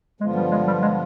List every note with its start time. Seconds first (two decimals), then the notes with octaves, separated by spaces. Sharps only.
0.20 G2 D3 F3 G#3 B3 F4
0.36 G3
0.51 G#3
0.67 G3
0.82 G#3